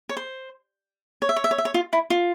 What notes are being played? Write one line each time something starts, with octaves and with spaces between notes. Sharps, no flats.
C#5
C5
C#5
E5
C#5
E5
C#5
E5
C#5
F4
E4
F4